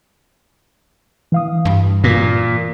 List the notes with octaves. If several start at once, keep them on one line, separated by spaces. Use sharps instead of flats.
E3 F5 D#6
G2
A#2